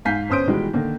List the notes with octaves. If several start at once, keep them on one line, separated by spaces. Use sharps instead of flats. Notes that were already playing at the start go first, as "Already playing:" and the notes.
G#2 F5 G#5 G6 B6 C7
G1 C#4 C5 D#6 G6 D7
B2 D#3 E3 G3 G#3 F#4
D3 D#3 A#3